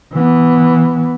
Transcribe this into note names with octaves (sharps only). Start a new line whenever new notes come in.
E3 B3